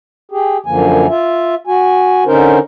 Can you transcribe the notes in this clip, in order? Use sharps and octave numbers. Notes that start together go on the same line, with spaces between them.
G4 G#4
F#2 D3 F3 A#3 G#5
F4 E5
F#4 G#5
D3 C#4 D#4 A#4 C5